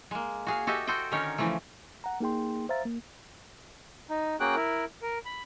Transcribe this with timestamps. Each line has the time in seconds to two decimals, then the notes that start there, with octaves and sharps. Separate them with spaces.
0.11 G#3 A#3
0.46 F#4 G#4 F5
0.67 F#4 G4 A4 D#5 E5
0.87 F#4 A4 C5 D#5 G5
1.11 D3 D#3 C#4 D#4 A#4 C#5
1.38 C#3 E3 F3 A3
2.04 F#5 A#5
2.20 A#3 D#4 G#4 G5 C6
2.69 C5 E5 F5 A#5 A6
2.85 A#3
4.10 D#4
4.40 A#3 C#4 F#4 G#4 G5 F#6
4.56 E4 A#4
5.02 A#4
5.25 B5